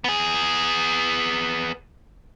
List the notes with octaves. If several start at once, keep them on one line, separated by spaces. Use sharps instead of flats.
B3 G#4